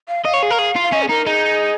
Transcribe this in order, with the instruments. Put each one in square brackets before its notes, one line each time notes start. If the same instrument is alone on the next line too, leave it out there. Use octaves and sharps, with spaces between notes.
[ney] F5
[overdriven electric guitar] D#5 [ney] F5
[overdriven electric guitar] C#5
G#4
A#4
G#4
F4
[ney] F5
[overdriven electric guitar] C#4 [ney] D#5
[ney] G#4
[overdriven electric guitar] D#4 [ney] A#4
[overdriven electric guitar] D#4 [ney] G#4